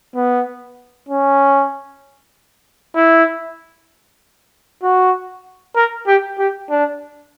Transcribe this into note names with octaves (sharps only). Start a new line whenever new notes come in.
B3
C#4
E4
F#4
A#4
G4
G4
D4